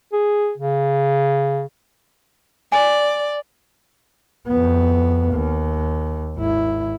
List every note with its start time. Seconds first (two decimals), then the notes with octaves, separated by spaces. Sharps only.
0.13 G#4
0.58 C#3
2.72 D5 G#5
4.48 F2 B3
5.32 D#2
6.36 G#1 E4